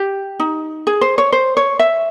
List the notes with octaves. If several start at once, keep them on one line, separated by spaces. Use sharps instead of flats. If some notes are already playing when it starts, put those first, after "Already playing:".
Already playing: G4
D#4
G#4
C5
C#5
C5
C#5
E5